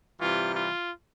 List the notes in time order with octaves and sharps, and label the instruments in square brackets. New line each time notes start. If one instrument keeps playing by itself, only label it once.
[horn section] C3 E3 G3 F4
F4